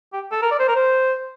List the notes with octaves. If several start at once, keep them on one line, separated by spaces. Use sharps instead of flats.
G4
A4
A#4
D5
C5
A#4
C5